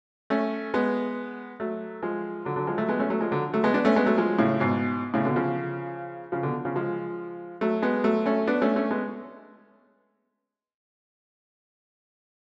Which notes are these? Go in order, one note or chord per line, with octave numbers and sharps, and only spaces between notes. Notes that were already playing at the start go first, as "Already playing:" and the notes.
A3 C#4
G#3 B3
F#3 A3
F3 G#3
D3 F#3
D3 F#3
F3 G#3
F#3 A3
G#3 B3
A3 C#4
F#3 A3
F3 G#3
D3 F#3
F#3 A3
G#3 B3
B3 D4
A3 C#4
G#3 B3
F#3 A3
F3 G#3
A2 C#3
G#2 B2
A2 C#3
B2 D3
C#3 F3
C#3 F3
B2 D3
C#3 F3
F3 G#3
F#3 A3
G#3 B3
F#3 A3
A3 C#4
B3 D4
A3 C#4
A3 C#4
G#3 B3